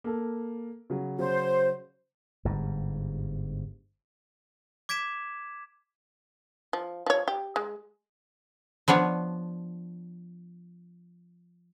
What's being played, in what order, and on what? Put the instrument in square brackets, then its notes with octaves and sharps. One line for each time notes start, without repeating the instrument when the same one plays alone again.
[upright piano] A#3 A4
C#3 F#3
[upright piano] C#3 F#3 [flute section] C5
[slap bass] G1 G#2
[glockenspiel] D6 G#6 B6 D7 E7
[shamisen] F3
F3 C#5
G4
G#3
[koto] F3 B3 D4 C#5